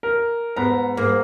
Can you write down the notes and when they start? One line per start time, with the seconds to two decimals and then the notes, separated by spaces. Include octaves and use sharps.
0.03 A#4
0.56 G#2 B3 A#5
0.97 G#2 A#3